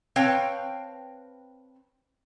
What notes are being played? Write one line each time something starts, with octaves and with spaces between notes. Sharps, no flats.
C4 B4 C#5 F5 G5 A5